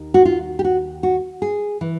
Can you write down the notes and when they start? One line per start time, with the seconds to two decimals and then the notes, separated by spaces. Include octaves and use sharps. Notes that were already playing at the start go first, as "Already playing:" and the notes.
Already playing: D#2 D#3
0.14 F#4
0.25 F4
0.59 G4
0.64 F#4
1.03 F#4
1.42 G#4
1.81 E3